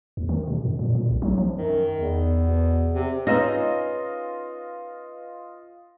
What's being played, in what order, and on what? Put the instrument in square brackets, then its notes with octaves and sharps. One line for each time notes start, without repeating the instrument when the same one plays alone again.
[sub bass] D#2
D#3
B2
F#2
A#2
A#2
B1
F#3
F3
[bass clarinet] F#2 [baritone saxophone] D#3
[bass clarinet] E2
[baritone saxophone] B2
C3
[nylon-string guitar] C#4 D#4 G#4 [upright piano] F4 D#5 [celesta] B4 A#6